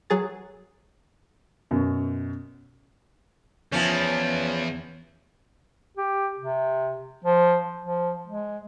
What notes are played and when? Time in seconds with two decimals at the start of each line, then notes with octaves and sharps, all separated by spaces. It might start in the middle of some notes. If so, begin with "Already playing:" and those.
0.10 F#3 G#4 A6
1.71 F#2 B2
3.72 E2 F3 C#4
5.97 G4
6.39 C3
7.24 F3
7.81 F3
8.27 G#3